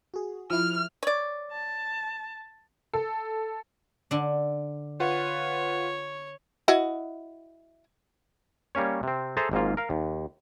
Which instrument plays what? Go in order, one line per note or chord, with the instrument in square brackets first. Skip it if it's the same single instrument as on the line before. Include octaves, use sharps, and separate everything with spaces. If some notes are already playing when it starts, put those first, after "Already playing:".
[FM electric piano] F#4 G#4
[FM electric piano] F3 E4 [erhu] F6
[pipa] C#5 D5
[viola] A5
[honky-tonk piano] A4
[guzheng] D3 D4
[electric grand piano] F4 B4 F#5 [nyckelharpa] C#5
[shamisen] E4 F#4 D#5
[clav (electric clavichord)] G3 A#3 C#4 C#5
C3 C4
G#4 A4 C5 E5 A5 A#5
G#1 G#2 A#3 F4
A#4 F5
D#2